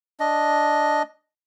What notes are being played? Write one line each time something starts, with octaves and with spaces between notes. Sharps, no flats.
D4 D#5